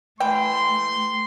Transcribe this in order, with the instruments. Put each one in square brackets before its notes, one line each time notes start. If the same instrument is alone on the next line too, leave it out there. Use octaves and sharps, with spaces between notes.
[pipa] E3 G5 [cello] A3 [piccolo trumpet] C6